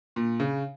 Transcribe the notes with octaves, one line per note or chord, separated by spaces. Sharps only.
A#2
C#3